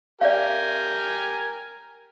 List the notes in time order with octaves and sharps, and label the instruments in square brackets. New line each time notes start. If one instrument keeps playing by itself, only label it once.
[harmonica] G4 A#4 G#5 [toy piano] D5 E5 F5